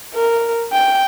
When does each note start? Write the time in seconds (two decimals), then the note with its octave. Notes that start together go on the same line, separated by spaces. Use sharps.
0.14 A#4
0.73 G5